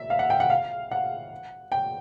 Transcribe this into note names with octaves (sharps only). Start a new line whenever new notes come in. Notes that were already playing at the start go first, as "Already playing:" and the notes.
Already playing: E5
F5
F#5
G5
F#5
F5
F#5
G5